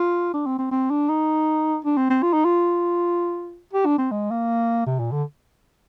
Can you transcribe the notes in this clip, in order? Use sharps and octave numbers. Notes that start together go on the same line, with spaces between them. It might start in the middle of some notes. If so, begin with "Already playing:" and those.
Already playing: F4
D4
C4
C4
C4
D4
D#4
D4
C4
C4
F4
D#4
F4
G4
D4
C4
G#3
A#3
C3
A#2
D3